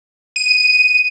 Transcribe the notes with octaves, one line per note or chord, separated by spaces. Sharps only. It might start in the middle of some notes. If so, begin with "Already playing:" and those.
D#7